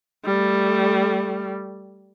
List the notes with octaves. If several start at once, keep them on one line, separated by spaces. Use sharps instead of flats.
G3 A3